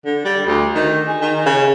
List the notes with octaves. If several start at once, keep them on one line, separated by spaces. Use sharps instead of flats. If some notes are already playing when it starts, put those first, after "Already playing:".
D3
G3
D2
D#3
G#4
D#3
C#3